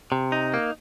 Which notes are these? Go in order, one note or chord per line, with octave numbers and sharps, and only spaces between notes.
C3
D#4
A#3